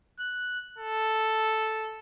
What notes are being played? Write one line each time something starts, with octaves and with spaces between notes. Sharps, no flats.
F#6
A4